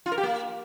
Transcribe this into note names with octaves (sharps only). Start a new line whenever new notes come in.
F4
A#4
G4
A#3